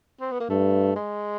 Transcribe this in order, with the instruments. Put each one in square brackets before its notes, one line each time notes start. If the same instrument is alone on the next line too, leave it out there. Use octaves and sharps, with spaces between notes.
[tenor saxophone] C4
B3
A#3
[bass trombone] G2 [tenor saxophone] A3
[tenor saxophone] G#3